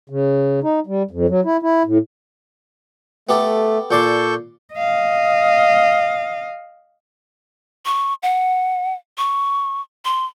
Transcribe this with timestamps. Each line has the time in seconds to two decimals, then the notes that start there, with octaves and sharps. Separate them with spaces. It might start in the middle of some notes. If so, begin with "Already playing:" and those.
0.10 C#3
0.63 D#4
0.87 G3
1.11 F2
1.29 F#3
1.45 E4
1.62 E4
1.86 A2
3.29 A3 B3 G4 A4
3.91 A#2 A4 D5 C6 C#6 G6
4.74 D#5 F5
7.86 C#6
8.23 F#5
9.18 C#6
10.05 C6